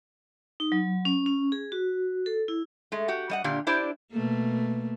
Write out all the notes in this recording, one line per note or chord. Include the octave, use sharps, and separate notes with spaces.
D#4
F#3
C#4
C#4
G#4
F#4
A4
E4
G#3 A3
F#4 G4 F#5
G3 D#5 F#5
A#2 D3 D4 G4 F5
D4 E4 G4 C5 D5
B2 A3 A#3